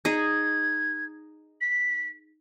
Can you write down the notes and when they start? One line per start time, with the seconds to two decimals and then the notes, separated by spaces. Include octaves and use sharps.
0.05 D#4 G#4 G#6
1.61 B6